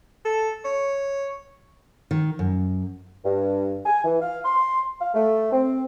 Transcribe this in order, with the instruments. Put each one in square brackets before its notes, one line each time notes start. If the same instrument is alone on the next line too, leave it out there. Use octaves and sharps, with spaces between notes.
[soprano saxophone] A4
C#5
[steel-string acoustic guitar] D#3
F#2
[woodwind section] G2
G#5
E3
F5
C6
F5
A3
C4